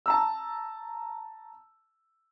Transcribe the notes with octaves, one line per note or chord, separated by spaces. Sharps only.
A5 A#5 E6